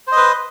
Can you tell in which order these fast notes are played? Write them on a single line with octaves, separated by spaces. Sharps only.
C5 D#5 B4